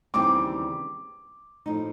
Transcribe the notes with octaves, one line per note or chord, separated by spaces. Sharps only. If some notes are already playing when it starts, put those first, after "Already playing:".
D#2 C#3 E3 G3 C4 D6
A2 F3 A#3 D#4